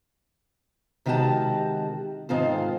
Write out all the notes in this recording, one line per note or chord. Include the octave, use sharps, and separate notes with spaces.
C3 D#3 G#3 F#4 G4 A5
G#2 D#3 C4 F4 A4 C5